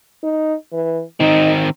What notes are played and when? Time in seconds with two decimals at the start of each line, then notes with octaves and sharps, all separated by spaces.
0.23 D#4
0.73 E3
1.20 D#3 C4 D#4